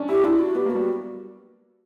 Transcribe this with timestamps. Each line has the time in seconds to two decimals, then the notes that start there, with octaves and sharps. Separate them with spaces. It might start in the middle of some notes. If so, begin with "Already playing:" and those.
Already playing: C#4 D4
0.09 E4 G4
0.24 D4 E4
0.39 F#4
0.55 B3 G4
0.66 A#3
0.70 G3 F#4